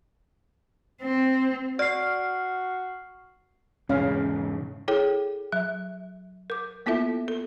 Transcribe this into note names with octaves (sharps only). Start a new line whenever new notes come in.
C4
F#4 D5 F6 C7
E1 G#2 C#3 C#4 F5
E4 G#4 A4 C#5 G5
F#3 E5
A#4 D6
A#3 B3 E4 F4 A4 E5
A4